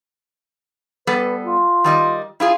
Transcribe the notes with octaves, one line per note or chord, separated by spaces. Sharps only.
G3 B3 A4 B4
F4
D#3 G3 D#5
E4 F4 G#4